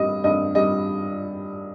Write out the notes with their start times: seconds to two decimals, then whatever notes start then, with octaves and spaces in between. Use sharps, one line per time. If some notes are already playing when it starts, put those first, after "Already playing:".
Already playing: G2 G3 D#5
0.24 G2 D#5
0.55 G3 D#5